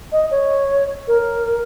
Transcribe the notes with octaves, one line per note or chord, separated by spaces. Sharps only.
D#5
C#5
A#4